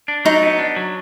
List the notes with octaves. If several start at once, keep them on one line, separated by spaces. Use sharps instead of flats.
D4
F#3 D#4
B3
D4
F#3